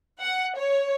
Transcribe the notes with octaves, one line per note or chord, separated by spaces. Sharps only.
F#5
C#5